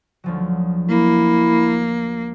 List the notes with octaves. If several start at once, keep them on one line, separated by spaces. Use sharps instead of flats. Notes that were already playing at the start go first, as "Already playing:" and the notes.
D2 F3 F#3
A#3 E4